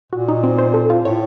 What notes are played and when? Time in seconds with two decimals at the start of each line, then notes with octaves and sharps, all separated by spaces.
0.12 A#2 F#4
0.28 D#4
0.43 C4
0.58 C5
0.74 A4
0.90 F4
1.05 A2 C#5